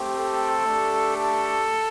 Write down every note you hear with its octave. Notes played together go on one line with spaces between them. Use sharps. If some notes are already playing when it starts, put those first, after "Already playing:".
Already playing: A3 C4 G4
A4
A3 D4 G4
A4